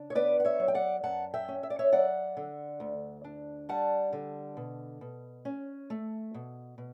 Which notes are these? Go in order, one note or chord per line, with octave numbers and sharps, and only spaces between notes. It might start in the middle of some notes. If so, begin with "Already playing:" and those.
Already playing: C#3 D4
C#5
B3 B4 D5
F#5
C#5 E5
F#3
G5
D5 F#5
F#2 F#5 A5
E5 G5
C#4
E5
D5
C#5 E5
F#3 D5 F#5
D3
D2
D4
G3 F#5 A5
D3
B2
B2
C#4
A3
B2
B2